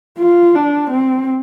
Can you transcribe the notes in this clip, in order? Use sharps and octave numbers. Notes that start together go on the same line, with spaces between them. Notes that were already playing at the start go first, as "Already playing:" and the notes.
F4
D4
C4